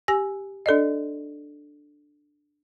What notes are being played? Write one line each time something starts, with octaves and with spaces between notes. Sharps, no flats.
G4 G#5 A#6
D4 A4 D5 D#5